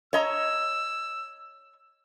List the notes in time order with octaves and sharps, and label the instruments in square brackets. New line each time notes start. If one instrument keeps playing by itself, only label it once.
[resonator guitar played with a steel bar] C#5 D#5 A#5 [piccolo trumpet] E6